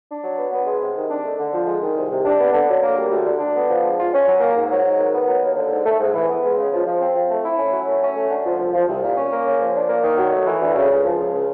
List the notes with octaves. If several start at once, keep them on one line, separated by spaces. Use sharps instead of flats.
D4
F#3
B3
B3
G#3
C3
D#3
D4
A3
D3
F3
G#3
D#3
C2
C3
D4
B3
D3
F#3
A#3
G3
D2
D3
D4
B3
F3
G#3
F4
C#4
F#3
A#3
G#2
F#3
G#2
D#3
B3
F#3
D#2
D3
G#2
A3
G#2
E3
B3
G#3
C#3
F3
F3
C4
F3
A3
E4
C#4
F#3
A3
C#4
A3
D3
F3
C2
F3
C2
A#2
C#4
A#3
C#3
F3
D4
A#3
D#3
F#3
A3
E3
D2
C#3
C#2
F3
C#2
C#3